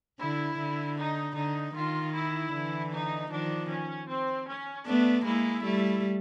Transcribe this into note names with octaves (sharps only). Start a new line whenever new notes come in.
D3 E4
D3
D#4
D3 D#4
D#3 F4
E4
D3 E3
D#4
D#3 F3 D4
C#4
C4
C#4
A3 B3 D4
G#3 A#3 E4
G3 A3